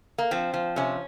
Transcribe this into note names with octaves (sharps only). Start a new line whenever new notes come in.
A#3
F3 C4
F3
C3 C#4